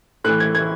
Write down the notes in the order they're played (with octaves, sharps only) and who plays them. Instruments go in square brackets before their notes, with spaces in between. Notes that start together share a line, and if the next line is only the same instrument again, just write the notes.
[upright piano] A2 E3 F#6
G#6
G#6